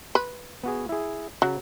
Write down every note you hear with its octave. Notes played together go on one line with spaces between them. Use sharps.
B4
B3 F#4 G#4
E4 G#4
C#3 F#3